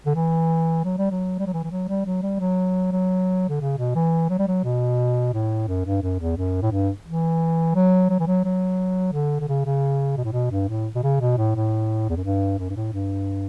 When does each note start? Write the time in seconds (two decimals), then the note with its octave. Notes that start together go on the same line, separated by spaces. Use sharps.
0.06 D3
0.15 E3
0.84 F#3
0.98 G3
1.11 F#3
1.39 G3
1.47 F#3
1.53 E3
1.64 E3
1.71 F#3
1.88 G3
2.06 F#3
2.23 G3
2.40 F#3
2.92 F#3
3.49 D3
3.61 C#3
3.78 B2
3.95 E3
4.30 F#3
4.39 G3
4.48 F#3
4.64 B2
5.34 A2
5.68 F#2
5.85 G2
6.03 F#2
6.20 E2
6.37 F#2
6.62 A2
6.71 G2
7.07 E3
7.75 F#3
8.10 F#3
8.19 E3
8.27 F#3
8.44 F#3
9.13 D3
9.40 D3
9.48 C#3
9.65 C#3
10.17 B2
10.25 A2
10.32 B2
10.51 G2
10.69 A2
10.95 B2
11.03 C#3
11.20 B2
11.38 A2
11.55 A2
12.09 E2
12.17 F#2
12.24 G2
12.59 F#2
12.69 G2
12.76 A2
12.93 G2